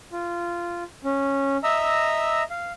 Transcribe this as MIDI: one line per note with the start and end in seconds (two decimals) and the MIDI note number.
0.12 0.83 65
1.04 1.57 61
1.63 2.43 75
1.63 2.43 76
1.63 2.43 82
1.63 2.43 88
2.50 2.73 77